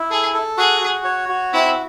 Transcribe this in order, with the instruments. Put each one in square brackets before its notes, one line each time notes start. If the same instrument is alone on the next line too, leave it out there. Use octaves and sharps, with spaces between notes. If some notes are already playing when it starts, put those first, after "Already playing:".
Already playing: [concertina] E4
[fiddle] G#4 [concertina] A4
[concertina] A4
[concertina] F#4 [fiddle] G#4
[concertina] F#4
C#5
F#4
[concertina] C4 [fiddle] E4